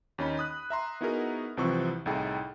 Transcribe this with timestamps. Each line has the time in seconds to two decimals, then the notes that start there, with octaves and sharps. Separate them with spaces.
0.18 D#2 C#4 D#4 B5
0.37 B5 D#6 F#6
0.70 E5 A#5 C6
1.01 B3 D#4 E4 F#4 G#4 A#4
1.57 C2 C3 E3 F3 C4 C#6
2.06 C2 A2 D#4 E4 G#4 G5